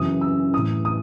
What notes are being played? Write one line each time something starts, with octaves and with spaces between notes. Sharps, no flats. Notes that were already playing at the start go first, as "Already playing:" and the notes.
Already playing: F#2 C#3 E3 D#6
E6
A2 E3 D#6
D#6